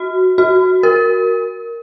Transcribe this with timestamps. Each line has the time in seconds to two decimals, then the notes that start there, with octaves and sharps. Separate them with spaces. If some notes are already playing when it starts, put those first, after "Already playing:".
Already playing: F#4
0.38 F#4
0.83 A#4